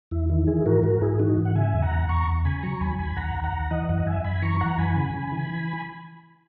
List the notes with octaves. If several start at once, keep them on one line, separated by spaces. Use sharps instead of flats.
E2 E4
D#3 E4
E3 E4 G#4
G#2 F#4 A#4
G#2 F#4 A#4
G#2 E4 G#4
E3 D#4 F#4
G#2
F#5
C#3 E5 G#5
E2
F#5 A#5
E2
E2 A#5 C#6
E2
C#3 G#5 B5
F#3 A#5 C#6
D#2 G#5 B5
D#2 G#5 B5
D#2 F#5 A#5
D#2
F#5 A#5
D#2
E3 D#5 F#5
F#2 D#5 F#5
F#2 E5 G#5
F#2 G#5 B5
E3 A#5 C#6
E3 F#5 A#5
F#2 G#5 B5
C#3
C#3
E3
E3